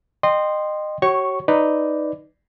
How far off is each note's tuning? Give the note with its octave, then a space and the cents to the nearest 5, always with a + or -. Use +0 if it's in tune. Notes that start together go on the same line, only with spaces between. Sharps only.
D#5 -25 G5 +0 C6 +0
F#4 +45 C#5 -15 C#6 +0
D#4 +0 B4 +10 D5 +0